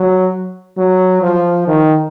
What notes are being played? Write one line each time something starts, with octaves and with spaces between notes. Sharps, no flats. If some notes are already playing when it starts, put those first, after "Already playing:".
Already playing: F#3
F#3
F3
D#3